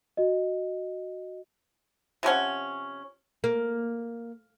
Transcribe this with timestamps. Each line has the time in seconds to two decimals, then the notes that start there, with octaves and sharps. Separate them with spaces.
0.17 F#4 D#5
2.23 C3 F3 C#4 F#5
3.44 A#3